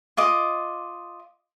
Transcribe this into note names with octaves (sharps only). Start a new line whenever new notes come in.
F4 D#5 D6